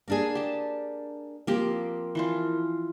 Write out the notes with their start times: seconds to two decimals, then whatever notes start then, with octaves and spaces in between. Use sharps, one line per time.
0.08 A#3 D4 G#4
0.35 G4 A5
1.47 F3 A#3 C4 G4
2.15 E3 F3 F4